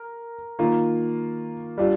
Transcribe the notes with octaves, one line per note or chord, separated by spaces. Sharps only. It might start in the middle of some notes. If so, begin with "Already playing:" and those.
Already playing: A#4
D#3 A#3 F4
G3 D4 F4